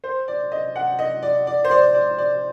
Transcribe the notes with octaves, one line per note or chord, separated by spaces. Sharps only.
C5
D5
D#5
F#5
D#5
D5
D5
C5
D5
D5
D5